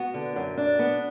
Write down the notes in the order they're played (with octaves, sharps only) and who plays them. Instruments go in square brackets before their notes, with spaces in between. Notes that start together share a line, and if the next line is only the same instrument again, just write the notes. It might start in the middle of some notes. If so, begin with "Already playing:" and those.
Already playing: [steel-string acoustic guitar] B3 [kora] F#4
[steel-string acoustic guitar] D3
F#2
D4
B3